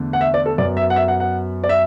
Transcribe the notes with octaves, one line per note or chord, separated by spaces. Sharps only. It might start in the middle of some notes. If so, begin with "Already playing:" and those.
Already playing: E2 D3 A3
F#5
E5
D5
A4
F#2 F#3 B3 D5
E5
F#5
E5
F#5
F#5
D5
E5